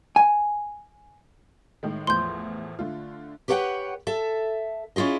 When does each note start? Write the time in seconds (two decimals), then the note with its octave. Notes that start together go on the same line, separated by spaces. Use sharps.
0.16 G#5
1.83 A2 D#3 G#3
2.07 E2 A2 F3 C6 G6
2.79 D3 A3 F4
3.48 G4 B4 C#5 D#5 F#5 G5
4.07 A4 E5
4.96 C#4 E4 F4 G#4 D#5